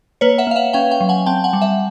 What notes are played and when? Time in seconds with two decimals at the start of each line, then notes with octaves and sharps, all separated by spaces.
0.21 A#3 B4 C#5
0.38 E5 F#5
0.47 A#3 F5
0.56 E5 F#5
0.73 C#4 F5 G5
0.91 F5 G5
1.01 F#3
1.09 F#5 G#5
1.26 C4 G5 A5
1.44 F#5 G#5
1.53 G3
1.62 E5 F#5